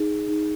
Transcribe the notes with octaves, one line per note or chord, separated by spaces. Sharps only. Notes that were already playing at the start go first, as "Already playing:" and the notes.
Already playing: D#4 G#4
D#4